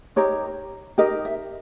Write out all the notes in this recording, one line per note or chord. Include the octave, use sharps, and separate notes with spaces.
D#4 G4 A#4 C#5
D#4 G4 A#4 D#5
E5